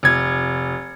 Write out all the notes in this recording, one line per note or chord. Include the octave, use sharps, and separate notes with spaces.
F1 G#6